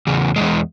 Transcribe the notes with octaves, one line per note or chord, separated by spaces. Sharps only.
E2 C#3
E2 C#3 G#3